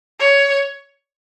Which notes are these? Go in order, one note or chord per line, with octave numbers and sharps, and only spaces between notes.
C#5